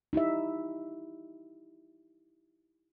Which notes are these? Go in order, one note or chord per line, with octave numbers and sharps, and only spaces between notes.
D#4 E4 G4 E5